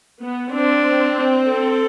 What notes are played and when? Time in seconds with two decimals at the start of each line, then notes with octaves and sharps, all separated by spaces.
0.23 B3
0.54 C4 D4
1.50 A4